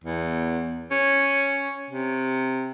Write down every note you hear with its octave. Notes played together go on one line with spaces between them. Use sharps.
E2
C#4
C3